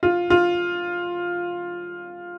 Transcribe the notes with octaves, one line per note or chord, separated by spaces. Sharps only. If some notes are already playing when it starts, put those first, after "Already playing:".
F4
F4